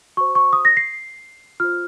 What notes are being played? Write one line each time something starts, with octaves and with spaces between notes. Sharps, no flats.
F#4 C5 C#6
C#6
D#6
A#6
C7
F4 C5 F6